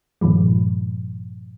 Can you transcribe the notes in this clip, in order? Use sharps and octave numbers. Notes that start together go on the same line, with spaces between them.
G2 A#2 D#3 F3 G#3